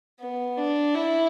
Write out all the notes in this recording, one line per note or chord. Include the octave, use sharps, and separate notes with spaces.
B3
D4
E4